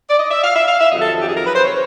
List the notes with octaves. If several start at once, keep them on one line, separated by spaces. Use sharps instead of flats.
D5
D#5
E5
F5
E5
F5
E5
F2 C3 D#3 F#3 D#5
A4
G4
G#4
A#4
B4
C5
C#5